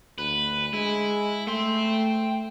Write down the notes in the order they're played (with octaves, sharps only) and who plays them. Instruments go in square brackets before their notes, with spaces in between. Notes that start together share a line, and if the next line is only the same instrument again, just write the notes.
[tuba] D2 [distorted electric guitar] B4
[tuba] G#3 [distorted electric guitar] E4
[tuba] A3 [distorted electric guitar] G5 C6